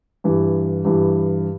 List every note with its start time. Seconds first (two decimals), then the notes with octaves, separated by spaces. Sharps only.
0.24 G2 E3
0.85 G2 E3